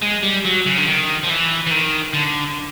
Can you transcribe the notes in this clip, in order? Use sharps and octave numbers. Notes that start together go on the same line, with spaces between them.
G#3
G3
F#3
C#3
D3
D#3
F3
E3
E3
D#3
D3